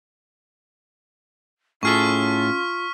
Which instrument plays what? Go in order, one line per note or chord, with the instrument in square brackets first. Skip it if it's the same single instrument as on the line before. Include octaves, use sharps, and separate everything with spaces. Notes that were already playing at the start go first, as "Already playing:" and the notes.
[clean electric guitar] A2 G#4 A4 [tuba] C#4 [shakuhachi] F4 [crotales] C#6 F6 B6